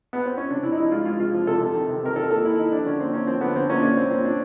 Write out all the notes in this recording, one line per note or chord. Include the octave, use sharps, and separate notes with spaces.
B3
C4
C#4
C3 D4
C3 E4
D#4
F3 E4
G#3 F4
G#3 F4
C3 F4
F3
C3 A4
C3
D#3
C3
C3 A#4
D#3 A4
A#3 A4
A#3 E4
D#3 D#4
F3 D4
D3 C#4
A#3 C4
A#3 C#4
F3 C4
D3 B3
D3 C4
A#3 C#4
D4
A#2 C#4
A#2 C4
A#2 C4
A#2 D4